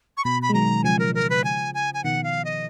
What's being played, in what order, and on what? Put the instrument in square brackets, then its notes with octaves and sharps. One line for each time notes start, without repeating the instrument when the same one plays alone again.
[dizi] C#6
[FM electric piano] B2 [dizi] B5
[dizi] B5
[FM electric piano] G#3
[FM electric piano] D#3 F#3 [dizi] A#5
[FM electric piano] C#3 F3 [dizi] G#5
[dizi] A#4
A#4
B4
G#5
G#5
G#5
[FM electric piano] B2 D#3 [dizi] F#5
[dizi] F5
D#5